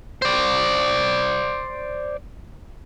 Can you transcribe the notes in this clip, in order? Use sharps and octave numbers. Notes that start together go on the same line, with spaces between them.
C5 D5